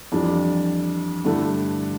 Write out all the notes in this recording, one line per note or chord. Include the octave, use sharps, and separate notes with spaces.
F2 E3 G3 D4
G2 D3 A3 E4